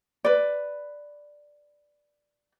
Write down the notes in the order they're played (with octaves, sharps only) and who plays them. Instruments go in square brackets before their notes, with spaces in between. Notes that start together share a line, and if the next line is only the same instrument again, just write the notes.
[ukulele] B4 D5